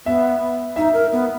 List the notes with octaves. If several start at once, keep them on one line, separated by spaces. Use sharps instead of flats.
B3 E5
D#4 E5
A#4
B3